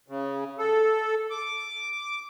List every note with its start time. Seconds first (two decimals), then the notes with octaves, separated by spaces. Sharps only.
0.08 C#3
0.59 A4
1.30 D6